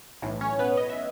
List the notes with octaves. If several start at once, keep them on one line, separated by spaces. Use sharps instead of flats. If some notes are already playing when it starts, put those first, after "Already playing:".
B1 A2 E3
C#4 C#5
B3 B4
D#5
E5